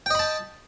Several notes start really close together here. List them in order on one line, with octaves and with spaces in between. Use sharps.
G5 D#5 B5 A5